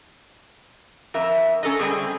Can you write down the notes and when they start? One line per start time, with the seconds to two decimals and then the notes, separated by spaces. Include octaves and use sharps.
1.14 F2 A#4 E5
1.63 C#4 A4 A#4 D#5
1.79 G3 C4 G#4